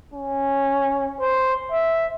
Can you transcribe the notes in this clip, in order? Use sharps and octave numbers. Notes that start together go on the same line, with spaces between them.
C#4
C5
E5